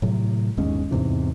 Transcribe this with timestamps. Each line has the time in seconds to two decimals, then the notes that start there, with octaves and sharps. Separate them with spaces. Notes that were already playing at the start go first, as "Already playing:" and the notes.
0.02 A2 C3 F#3
0.57 G1 D#2 G#3 C#4
0.91 E2 G#2 C3 E3